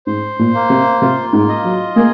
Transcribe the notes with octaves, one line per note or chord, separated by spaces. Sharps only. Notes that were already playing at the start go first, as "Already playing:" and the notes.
G#2 C5
A#2
A#3
C3
C3 F4
G#2
D#5
F#3
A#3 G#4